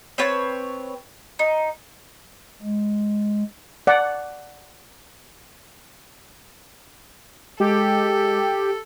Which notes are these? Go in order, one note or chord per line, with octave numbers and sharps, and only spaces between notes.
C4 B4 C#5 A5
D#4
G#3
D5 F#5
G#3 G4 A4